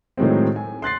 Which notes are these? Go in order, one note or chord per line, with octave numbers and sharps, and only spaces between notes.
A2 D#3 F#3 G#3 C4
G#5
C6 F#6 A6 C7